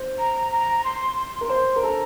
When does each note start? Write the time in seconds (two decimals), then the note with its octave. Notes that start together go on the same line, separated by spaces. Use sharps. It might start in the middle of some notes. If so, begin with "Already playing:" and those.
Already playing: C5
0.19 A#5
0.52 A#5
0.84 C6
1.17 C6
1.41 A#4
1.49 C5 C6
1.76 A#4
1.83 A4 A#5